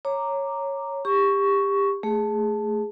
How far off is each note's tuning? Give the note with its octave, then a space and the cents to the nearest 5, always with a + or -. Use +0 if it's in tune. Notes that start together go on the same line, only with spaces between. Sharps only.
C#5 -5 A#5 -5 D6 +0
G4 +25 C#6 +5
A3 +0 G#4 +0